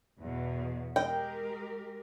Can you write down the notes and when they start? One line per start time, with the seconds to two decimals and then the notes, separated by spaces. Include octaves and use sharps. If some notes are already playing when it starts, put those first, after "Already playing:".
0.21 E2 B2
0.96 G#3 G4 A#4 D#5 G5